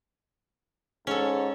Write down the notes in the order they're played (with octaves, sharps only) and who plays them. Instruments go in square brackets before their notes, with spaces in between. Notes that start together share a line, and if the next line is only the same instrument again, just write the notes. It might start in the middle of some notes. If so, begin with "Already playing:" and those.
[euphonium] G#2 [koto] C#4 A4